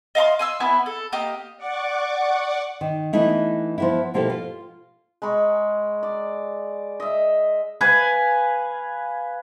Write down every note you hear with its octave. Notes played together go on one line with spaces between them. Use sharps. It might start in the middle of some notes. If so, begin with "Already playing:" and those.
D#5 F5 A#5 C6
G#5 C6 E6
B3 E4 G#5
A4
A#3 G4 D#5
D5 F#5 C#6 D6
D#3
E3 A3 B3 D#4 E4
F3 B3 E4
B2 F3 A#3 E4 G4 A4
F4
G#3 A#5 B5 C#6
D5
D#5 E5
B4 F5 G#5